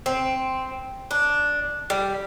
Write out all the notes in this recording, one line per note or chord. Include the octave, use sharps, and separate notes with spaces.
C4
D4
G3